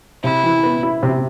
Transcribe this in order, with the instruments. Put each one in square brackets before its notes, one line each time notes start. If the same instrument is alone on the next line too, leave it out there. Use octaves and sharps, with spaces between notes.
[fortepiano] C3 [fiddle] E4
[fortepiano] E3
B3
E4
C3